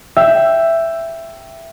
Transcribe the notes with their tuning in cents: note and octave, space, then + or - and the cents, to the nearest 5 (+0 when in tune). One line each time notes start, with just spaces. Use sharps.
E5 +10 G5 +0